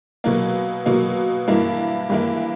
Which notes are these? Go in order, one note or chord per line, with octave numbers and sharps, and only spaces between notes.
B2 F#3 A#3
B2 F#3 A#3
G2 E3 A#3 E4
G2 E3 A#3 E4